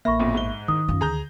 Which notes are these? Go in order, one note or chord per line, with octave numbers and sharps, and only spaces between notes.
A1 A#3 E5 B5 C#6 A#6
B1 F2 A#2
G#2 G7
D#3 E4 D#6
F#2 F4
D2 G#4 A#5 G6